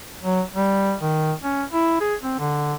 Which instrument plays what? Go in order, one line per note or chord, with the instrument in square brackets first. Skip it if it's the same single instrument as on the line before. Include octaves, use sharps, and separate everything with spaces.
[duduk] F#3
G3
D#3
C#4
E4
G#4
C4
D3